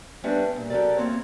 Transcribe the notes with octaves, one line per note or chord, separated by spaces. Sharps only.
G3 A3 B3 C#4 D4
E2 G2 A#2
F#3 C#4 G4 A4 A#4 D5
E2 A#3 C4 C#5